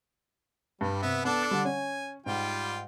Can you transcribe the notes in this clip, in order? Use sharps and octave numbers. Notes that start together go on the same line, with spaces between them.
G2 G3
C3 B3 E5
B3 D4 A4 D5
D3 G3
C#4 G#5
G#2 G3 F4 G5